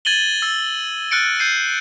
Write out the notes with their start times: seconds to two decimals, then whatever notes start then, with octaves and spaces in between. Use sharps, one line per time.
0.05 G#6 A6 D#7 F#7 G7
0.42 E6 A6
1.11 F6 F#6 A6 C#7 D7
1.39 G6 C7 D#7